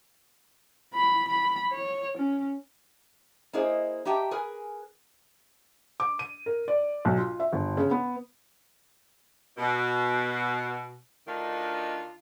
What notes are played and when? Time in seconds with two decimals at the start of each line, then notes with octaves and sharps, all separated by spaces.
0.94 B5
1.28 B5
1.72 C#5
2.18 C#4
3.53 A#3 D#4 E4 G#4 C5 D#5
4.05 D#4 G4 E5 G5 A5 A#5
4.31 G#4 A#4 B4 G#5
6.00 D6
6.19 D#7
6.46 A#4
6.68 D5
7.05 B1
7.18 F4
7.40 E5
7.53 G1
7.77 C#3
7.91 B3
9.57 B2
11.27 D2 D#3 D4 D#4 F4